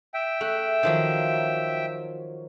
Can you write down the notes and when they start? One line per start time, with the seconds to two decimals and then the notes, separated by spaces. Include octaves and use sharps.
0.14 E5 G5
0.41 A3 F#5
0.83 D#3 F3 F#3